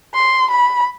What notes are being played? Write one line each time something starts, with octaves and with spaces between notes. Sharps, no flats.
C6
B5